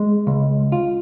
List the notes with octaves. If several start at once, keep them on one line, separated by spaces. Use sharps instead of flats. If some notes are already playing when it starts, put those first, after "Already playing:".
Already playing: G#3
C#2
F4